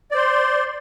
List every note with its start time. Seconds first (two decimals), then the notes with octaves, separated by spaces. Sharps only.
0.11 D5
0.14 C5
0.18 C6